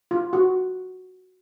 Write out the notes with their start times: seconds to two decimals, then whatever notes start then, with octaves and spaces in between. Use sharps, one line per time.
0.11 F4
0.33 F#4